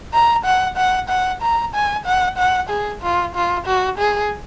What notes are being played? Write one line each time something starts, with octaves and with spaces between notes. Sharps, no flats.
A#5
F#5
F#5
F#5
A#5
G#5
F#5
F#5
G#4
F4
F4
F#4
G#4